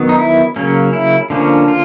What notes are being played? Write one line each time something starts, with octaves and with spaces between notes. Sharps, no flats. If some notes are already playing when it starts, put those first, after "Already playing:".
Already playing: D#3 F#3 B3
D#4
E4
C#3 F#3 A#3 C#4
E4
D3 F3 A#3 C#4
F4